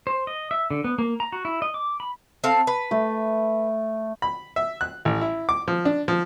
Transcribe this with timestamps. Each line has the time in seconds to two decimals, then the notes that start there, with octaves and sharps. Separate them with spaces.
0.07 C5
0.27 D#5
0.51 E5
0.71 D3
0.84 B3
0.99 A#3
1.20 A#5
1.32 F#4
1.45 E4
1.62 D#5
1.74 D6
2.00 B5
2.44 C4 A4 F5
2.67 B4
2.91 A3
4.22 B5
4.56 E5
4.81 F#6
5.05 A1
5.21 E4
5.49 D6
5.68 F3
5.85 D4
6.08 F3